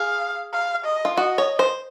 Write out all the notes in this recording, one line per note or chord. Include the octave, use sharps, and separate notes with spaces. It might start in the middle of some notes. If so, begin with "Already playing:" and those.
Already playing: G#4 F5
F5
D#5
F4
F#4 D#5
C#5
C5